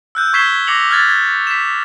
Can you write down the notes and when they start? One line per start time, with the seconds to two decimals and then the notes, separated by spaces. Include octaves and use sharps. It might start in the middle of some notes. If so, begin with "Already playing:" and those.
0.15 E6 F#6 G6
0.33 C#6 G#6 B6 C7 E7 G7
0.67 D6 A#6 C7 C#7 F7 F#7
0.90 F6 F#6 G#6 A6
1.09 G#6
1.47 B6 E7